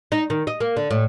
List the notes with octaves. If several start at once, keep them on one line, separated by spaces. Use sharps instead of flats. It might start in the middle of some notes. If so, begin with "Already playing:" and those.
D#4
D#3
D#5
A#3
D3
A2